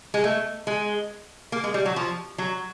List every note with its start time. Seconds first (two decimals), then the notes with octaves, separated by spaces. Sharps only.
0.14 G#3
0.24 A3
0.67 G#3
1.52 A#3
1.64 G#3
1.74 G3
1.86 F#3
1.96 F3
2.38 F#3